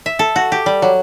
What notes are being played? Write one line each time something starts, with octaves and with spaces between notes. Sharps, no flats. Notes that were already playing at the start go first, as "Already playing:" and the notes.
E5
A4
F#4
G4
G3
F#3